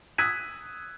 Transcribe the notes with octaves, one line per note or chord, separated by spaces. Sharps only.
D#6 E6 F#6 G#6 B6 D#7